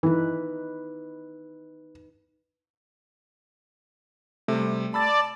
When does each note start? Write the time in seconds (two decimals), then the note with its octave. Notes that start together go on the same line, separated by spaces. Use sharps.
0.03 E3 D#4 B4
4.48 C3 G3 A3
4.94 D5 A5 B5 E6 A6